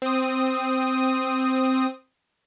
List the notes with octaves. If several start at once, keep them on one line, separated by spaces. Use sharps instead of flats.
C4 D#6